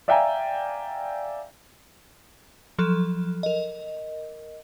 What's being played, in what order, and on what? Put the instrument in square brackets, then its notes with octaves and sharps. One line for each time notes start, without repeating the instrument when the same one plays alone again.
[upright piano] D5 E5 F5 G5 G#5 A#5
[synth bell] F3 F#3 A4
A#4 D#5